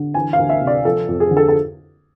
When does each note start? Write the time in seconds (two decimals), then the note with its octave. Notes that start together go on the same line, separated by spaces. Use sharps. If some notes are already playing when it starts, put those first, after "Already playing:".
Already playing: D3
0.14 E3 G#5
0.33 F5
0.39 D2
0.49 E5
0.61 C3
0.67 D5
0.85 F3 A4
1.08 F2
1.20 G#4
1.31 D3
1.37 A4
1.48 A4